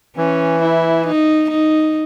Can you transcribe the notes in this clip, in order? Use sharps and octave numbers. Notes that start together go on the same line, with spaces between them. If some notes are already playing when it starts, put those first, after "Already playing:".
E3 C#4
E4
D#4
D#4